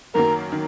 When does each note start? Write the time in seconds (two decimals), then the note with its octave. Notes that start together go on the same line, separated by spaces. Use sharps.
0.14 F#2 D#3 F#3 A#3 A#4
0.52 D#3